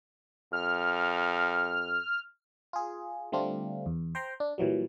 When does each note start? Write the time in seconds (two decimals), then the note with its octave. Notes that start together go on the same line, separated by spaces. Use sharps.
0.53 F2 F6
2.73 F4 G#4
3.32 D3 G3 A3 C4 D4 F4
3.86 E2
4.15 C5 G5 A#5 C6
4.40 D4
4.58 A#2 E3 F#3 G3